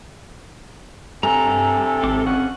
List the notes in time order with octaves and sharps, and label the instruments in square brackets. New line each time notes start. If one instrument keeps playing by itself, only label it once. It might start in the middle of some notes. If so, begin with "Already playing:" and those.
[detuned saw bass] G2 [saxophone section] C3 A4 [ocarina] G#5 [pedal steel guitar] A#5
[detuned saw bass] G#1 [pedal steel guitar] C4 D6
[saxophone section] F2 C#4 F#5